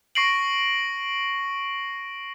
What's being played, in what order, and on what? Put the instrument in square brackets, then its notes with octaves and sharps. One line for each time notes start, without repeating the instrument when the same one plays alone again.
[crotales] C#6 A#6 C7 D7 F#7